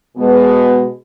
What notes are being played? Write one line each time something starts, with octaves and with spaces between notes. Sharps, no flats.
B2 G#3 B3